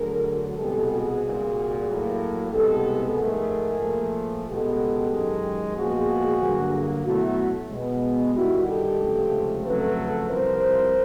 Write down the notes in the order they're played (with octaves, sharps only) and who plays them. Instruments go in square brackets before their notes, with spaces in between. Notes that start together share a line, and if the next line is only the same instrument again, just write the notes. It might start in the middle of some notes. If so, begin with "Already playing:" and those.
Already playing: [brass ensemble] D2 D3 F#3 G#4 A#4
C2 B2 G#3 B3 G4 A4
F#4 G#4
C2 A#2 G3
A2 F#3 A#3
C2 B2 G#3 B3 G4 A4
G#2 F3 A3 G#4 A#4
A#2 F3 A3
C#2 B2 G#3 B3 G4 A4
F#2 D#3 G#3
A#2 F3 G#3 B3 F#4 G#4
G2 D3 F#3 A#3
B2 F#3 A3 E4 F#4
B2 G#3 B3
G2 D#3 G3 E4 F#4
G4 A4
C#2 C3 F3 A3
F2 C#3 F#3 A3 A4 B4
C2 C3 F3 A#4 C5